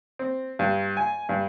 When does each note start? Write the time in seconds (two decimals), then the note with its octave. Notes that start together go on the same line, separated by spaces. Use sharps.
0.19 C4
0.59 G2
0.97 G#5
1.29 G2